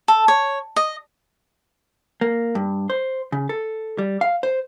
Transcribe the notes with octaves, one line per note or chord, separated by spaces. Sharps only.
A4
C#5
D#5
A#3
G2
C5
C#3
A4
G3
F5
C5